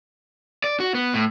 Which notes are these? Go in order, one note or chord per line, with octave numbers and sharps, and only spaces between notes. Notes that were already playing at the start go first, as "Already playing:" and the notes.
D5
F#4
B3
A2